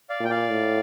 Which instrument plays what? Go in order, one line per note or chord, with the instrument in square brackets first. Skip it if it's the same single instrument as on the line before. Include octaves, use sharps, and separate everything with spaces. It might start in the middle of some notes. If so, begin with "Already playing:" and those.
[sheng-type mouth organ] D5 F5
[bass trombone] A#2 [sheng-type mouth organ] G5
[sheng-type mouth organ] D5 F5
[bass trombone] A2